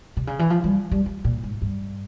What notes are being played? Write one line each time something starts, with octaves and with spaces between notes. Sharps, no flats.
C3
C#3
E3
F3
G3
G3
F3
A#2
G#2
G2